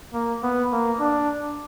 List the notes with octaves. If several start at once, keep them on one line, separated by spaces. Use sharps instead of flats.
A#3
B3
A#3
D4